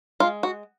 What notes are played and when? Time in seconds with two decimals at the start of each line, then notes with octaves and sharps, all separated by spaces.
0.20 G#3 F4
0.43 F#4